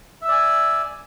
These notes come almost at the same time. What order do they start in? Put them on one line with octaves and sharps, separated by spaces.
E5 E6 D5 G#5